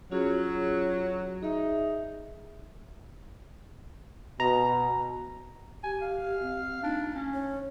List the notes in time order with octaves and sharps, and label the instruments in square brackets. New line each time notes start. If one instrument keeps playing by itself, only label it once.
[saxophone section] F#3 [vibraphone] C#4 F4 G#4
[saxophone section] D#4 [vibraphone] G#4 E5
[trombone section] B2 [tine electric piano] A#5
[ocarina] G4 [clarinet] G#5
[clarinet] F5
[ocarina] C4
[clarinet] D4 [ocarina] D#4
[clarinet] C#4
[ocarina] C#5